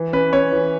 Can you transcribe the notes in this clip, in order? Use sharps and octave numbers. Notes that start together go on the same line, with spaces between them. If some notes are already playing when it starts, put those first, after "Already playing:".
Already playing: E3
C#4 B4
C#4 C#5
E3